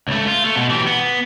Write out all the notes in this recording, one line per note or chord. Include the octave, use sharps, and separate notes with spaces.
C#2 A3
F4
A3
B2
E3 G4
B3